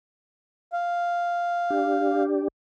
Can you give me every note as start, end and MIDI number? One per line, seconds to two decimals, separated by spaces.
0.73 2.23 77
1.70 2.48 62
1.70 2.48 67